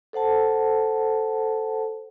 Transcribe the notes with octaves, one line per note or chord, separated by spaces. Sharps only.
A4 C5 F#5 A5